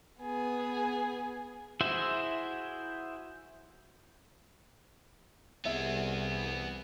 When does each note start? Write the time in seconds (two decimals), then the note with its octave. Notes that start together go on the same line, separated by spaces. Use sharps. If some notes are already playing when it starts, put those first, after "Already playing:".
0.21 B3 G#4
1.81 E4 F#4 G#4 C5 E5
5.65 C2 B3 G#4 E5